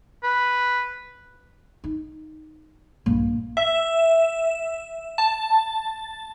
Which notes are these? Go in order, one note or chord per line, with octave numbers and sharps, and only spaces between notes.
B4
D#4
A#1 G2 A#3
E5
A5